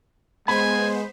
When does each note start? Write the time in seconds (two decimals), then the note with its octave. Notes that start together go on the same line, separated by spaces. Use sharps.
0.48 G#3 B3 C5 G#5 B5